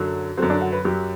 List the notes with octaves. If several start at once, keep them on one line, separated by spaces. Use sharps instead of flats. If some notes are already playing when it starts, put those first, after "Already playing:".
Already playing: F#2 D3 F#3
F#2 D3 F#3 C4
D4
F#4
B4
F#2 F#3 G4